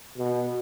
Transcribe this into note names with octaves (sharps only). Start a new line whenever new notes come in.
B2